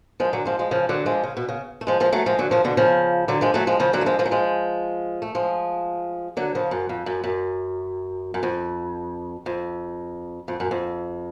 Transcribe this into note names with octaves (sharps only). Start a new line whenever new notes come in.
F3 G#3
D3 F#3
F3 G#3
F3 G#3
C#3 F3
D3 F#3
F3 G#3
C#3
B2
C#3
A3
F3 G#3
F3 G#3
F#3 A3
F3 G#3
D3 F#3
C#3 F3
B2 D3
C#3 F3
D3 F#3
F3 G#3
F#3 A3
F3 G#3
C#3 F3
D3 F#3
A3
F3 G#3
F3 G#3
F#3
F3 G#3
A3
F3 G#3
D3 F#3
C#3 F3
F#2
F2
F#2
F#2
F#2
F2
F2
F2
F#2
F2